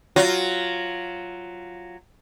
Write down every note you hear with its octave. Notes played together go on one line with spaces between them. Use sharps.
F#3 F4